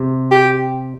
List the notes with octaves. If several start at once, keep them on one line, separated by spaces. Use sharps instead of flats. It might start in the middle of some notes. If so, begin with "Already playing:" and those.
Already playing: C3
G4